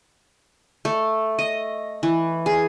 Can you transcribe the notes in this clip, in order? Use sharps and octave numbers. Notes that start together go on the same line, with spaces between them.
A3
D#5
E3
G#4